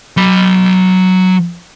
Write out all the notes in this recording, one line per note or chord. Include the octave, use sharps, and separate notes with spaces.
F#3 B5